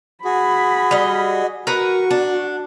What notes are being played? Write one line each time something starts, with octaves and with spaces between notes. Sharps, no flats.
F#4 G#4 B5
G3 D#5
F#4 A#4 B4 F#5 C#6
D4